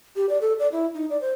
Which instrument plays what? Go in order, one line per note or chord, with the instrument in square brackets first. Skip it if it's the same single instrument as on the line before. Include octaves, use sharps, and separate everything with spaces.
[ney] G4
D5
A4
D5
E4
D#4
D5
C5